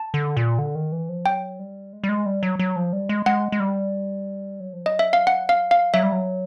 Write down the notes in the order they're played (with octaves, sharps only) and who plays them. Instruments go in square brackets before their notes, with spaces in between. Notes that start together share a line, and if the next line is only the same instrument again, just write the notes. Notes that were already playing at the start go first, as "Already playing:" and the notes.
Already playing: [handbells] A5
[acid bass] D3
A#2
D3
D#3
E3
F3
[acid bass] F#3 [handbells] G5
[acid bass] G3
G#3
G3
G#3
G3
F#3
F#3
F3
G3
G#3
[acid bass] G#3 [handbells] F#5
[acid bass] G#3
G3
F#3
F3
[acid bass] F#3 [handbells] D#5
[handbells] E5
F5
F#5
F5
F5
[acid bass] F#3 [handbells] E5
[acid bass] G3
F#3